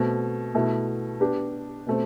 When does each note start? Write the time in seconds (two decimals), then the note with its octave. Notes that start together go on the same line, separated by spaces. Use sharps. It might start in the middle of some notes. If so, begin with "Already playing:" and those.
Already playing: B2 A3 C4
0.54 B2 A3 E4
1.20 B3 D4 G4
1.86 B2 A3 C4